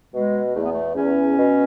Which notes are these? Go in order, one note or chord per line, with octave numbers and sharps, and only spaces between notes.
B2 G#3
E2 A3
B3
A3
E2 C#4
B2